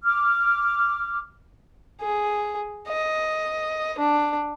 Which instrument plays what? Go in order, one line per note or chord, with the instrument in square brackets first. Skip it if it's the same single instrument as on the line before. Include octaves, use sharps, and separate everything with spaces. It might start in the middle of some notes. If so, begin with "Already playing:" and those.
[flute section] D6 F6
[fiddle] G#4
D#5
D4